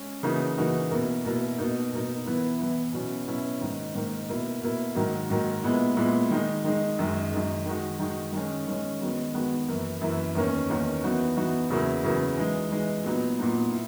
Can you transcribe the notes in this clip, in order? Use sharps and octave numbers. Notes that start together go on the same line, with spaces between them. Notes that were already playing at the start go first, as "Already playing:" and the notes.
Already playing: G#3 C#4
C#3 E3 A#3 D#4 F#4
C#3 E3 A#3 D#4 F#4
B2 A#3 E4
B2 A#3 E4
B2 A#3 D#4
B2 A#3 D#4
E3 B3 E4
E3 B3 E4
B2 F#3 C#4 E4
B2 F#3 C#4 E4
G#2 D#3 A#3
G#2 D#3 A#3
B2 A#3 E4
B2 A#3 E4
G#2 D#3 F#3 A#3
G#2 D#3 F#3 A#3
A#2 G#3 B3 E4
A#2 G#3 B3 E4
D#3 G#3 D#4
D#3 G#3 D#4
F#2 D#3 G#3
F#2 D#3 G#3
D#3 G#3 D#4 F#4
D#3 G#3 D#4 F#4
D#3 G#3 C#4
D#3 G#3 C#4
D#3 G#3 B3 F#4
D#3 G#3 B3 F#4
F#2 E3 A#3 E4
F#2 E3 A#3 E4
E2 D#3 A#3 C#4
E2 D#3 A#3 C#4
E3 B3 D#4 F#4
E3 B3 D#4 F#4
E2 C#3 F#3 A#3 E4
E2 C#3 F#3 A#3 E4
E3 G#3 D#4
E3 G#3 D#4
A#2 F#3 B3 D#4
A#2 F#3 B3 D#4
E4